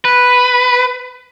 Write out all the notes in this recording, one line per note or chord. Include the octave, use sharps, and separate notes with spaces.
B4